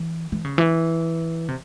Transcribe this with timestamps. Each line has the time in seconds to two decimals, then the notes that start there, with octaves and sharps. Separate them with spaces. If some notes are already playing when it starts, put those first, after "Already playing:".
Already playing: E3
0.32 E3
0.44 C#3
0.58 E3
1.48 C3